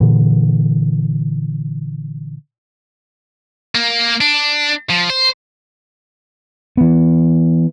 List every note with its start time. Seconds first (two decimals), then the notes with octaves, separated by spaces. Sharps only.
0.01 A#2 D3 E3
3.75 A#3
4.21 D4
4.90 F3
5.10 C5
6.77 E3 B3